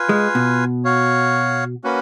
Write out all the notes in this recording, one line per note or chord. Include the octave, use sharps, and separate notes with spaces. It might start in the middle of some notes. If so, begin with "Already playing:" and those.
Already playing: F4 B4 F5 G#5
G#3
B2
F#4 C#5 F5
A#3 C#4 F#4 B4